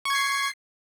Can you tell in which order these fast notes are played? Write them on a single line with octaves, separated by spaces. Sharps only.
C#6 G#6 C7